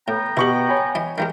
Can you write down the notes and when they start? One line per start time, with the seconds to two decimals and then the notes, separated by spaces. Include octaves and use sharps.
0.08 A2 B3 G5 A#5
0.37 B2 E4 G4 C#6 F#7
0.69 C#5 G#5 B5
0.95 E3 D#5
1.18 D#3 E3 G#3 A#4 G5